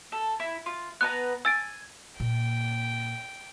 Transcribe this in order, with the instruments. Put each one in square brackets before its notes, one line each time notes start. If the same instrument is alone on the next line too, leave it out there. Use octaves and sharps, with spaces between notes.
[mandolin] A4
E4
F4
[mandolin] B3 B4 A#5 [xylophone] F#6
[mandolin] G#5 [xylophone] E6 A6 D7
[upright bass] A#2 A#3 [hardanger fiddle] G5